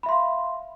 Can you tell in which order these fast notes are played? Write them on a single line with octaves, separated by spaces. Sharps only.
B5 E5 C6 F5